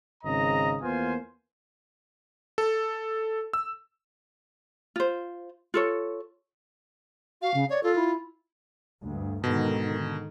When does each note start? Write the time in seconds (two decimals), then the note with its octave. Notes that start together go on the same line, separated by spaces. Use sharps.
0.24 G#1 C#3 C4 D#5 A#5
0.82 E2 A#3 B3 F4 C5 G#5
2.58 A4
3.53 E6
4.96 F4 C5
5.74 F4 A4 C#5
7.42 F#4 F5
7.54 C#3
7.70 C#5 D5
7.83 F4 A4
7.95 E4
9.05 D2 G2
9.44 G#2 B2 D3 D#3